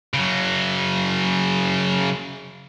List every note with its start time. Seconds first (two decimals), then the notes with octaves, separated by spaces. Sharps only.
0.14 C#3 F#3